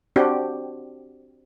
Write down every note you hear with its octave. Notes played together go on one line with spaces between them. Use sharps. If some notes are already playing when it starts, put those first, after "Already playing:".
C4 D4 F#4 G4